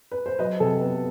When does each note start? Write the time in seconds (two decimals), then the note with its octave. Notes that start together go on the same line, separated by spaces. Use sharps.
0.11 B4
0.26 C5
0.39 F#3 B4 D#5
0.60 C3 A4
0.81 B3